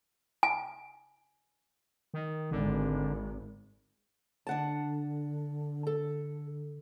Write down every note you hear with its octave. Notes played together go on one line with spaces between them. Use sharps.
G#5
D#3
G#1 D3
D3 D4 F#5 A5
A4